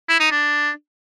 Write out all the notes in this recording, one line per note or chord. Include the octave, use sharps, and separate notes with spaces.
E4
D#4
D4